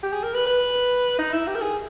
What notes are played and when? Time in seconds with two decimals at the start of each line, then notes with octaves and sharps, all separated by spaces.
0.03 G4
0.13 G#4
0.23 A#4
0.34 B4
0.47 B4
1.19 D#4
1.33 E4
1.47 G4
1.56 A#4
1.62 G#4